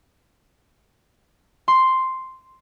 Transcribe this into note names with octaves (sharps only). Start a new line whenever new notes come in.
C6